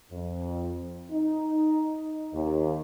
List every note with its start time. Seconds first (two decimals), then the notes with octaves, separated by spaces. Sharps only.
0.11 F2
1.11 D#4
2.34 D#2